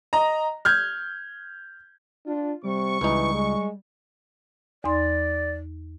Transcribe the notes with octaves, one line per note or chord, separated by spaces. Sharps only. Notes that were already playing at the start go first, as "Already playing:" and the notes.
D#5 A#5
F6 G6 G#6
D4 F4
C3 G3 C#6
C#2 E3 D#4
G#3
E2 D#4 D5 C6